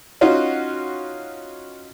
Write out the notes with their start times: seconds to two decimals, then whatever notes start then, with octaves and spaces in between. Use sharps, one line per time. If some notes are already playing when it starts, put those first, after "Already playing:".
0.21 C#4 D#4 F4 F#4